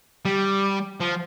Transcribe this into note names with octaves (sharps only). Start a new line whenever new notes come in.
G3
F3